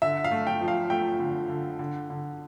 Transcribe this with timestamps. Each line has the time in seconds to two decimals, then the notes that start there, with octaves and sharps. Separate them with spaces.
0.02 D3 E5
0.24 F5
0.31 A3
0.47 G5
0.61 F3
0.68 F5
0.90 A3 G5
1.20 D3
1.49 D3
1.79 D3
2.10 D3